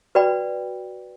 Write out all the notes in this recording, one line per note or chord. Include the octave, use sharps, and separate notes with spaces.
F#4 B4 D5 G5 B5